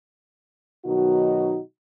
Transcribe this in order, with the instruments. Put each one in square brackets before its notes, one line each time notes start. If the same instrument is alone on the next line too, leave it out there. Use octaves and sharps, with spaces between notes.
[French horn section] B2 D#3 F#3 D#4 F#4